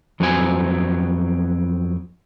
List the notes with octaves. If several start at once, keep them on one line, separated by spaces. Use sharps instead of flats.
F2 F#3 B3 C4 D4 G#5